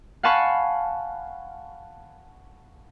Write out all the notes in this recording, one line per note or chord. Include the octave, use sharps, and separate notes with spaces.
F5 F#5 G#5 A5 B5 C#6